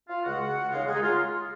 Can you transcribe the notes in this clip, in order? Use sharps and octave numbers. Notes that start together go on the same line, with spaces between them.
F4 F5
C#2 C#3 G#3 F#4 F#5
D#2 C#3 G#3 C#4 F4 F5
G#3 G#4
D#4
F4